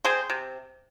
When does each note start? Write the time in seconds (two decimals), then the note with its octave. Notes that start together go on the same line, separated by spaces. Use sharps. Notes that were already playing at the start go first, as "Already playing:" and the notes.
0.05 C4 G#4 C5
0.30 C3